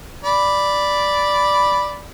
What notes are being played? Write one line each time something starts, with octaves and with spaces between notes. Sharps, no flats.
D5 B5